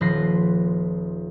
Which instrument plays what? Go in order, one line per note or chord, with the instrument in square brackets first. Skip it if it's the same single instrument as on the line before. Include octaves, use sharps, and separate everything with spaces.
[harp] D#1 F3 B4 C6 A#6 C7